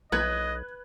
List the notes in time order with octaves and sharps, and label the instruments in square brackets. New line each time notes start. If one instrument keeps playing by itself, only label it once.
[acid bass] B1 [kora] B4 [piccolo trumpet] D#5 [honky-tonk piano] F#6 G#6